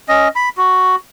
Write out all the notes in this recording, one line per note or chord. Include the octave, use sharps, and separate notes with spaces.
C#4 D#5
B5
F#4